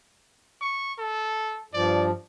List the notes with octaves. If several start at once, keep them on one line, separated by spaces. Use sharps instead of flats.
C#6
A4
G2 F3 D5